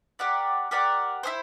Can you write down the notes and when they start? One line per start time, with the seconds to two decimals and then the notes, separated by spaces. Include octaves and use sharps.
0.19 G4 A#4 D5 F#5
0.71 G4 A#4 D5 F#5
1.23 E4 G#4 C5